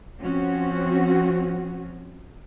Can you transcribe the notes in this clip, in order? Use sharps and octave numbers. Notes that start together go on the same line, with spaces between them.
F3 C4 C#4 F#4